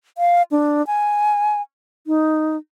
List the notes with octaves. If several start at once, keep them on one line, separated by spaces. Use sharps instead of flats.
F5
D4
G#5
D#4